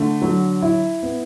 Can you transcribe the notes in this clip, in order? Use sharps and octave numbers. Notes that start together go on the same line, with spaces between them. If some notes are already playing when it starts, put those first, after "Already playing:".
Already playing: D3 A3
F#3
E4
B3